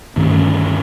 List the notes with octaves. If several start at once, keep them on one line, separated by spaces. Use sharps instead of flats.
D2 G2 D#3 C#4